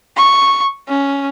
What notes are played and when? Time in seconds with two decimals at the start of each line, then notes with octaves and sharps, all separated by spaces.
0.17 C#6
0.89 C#4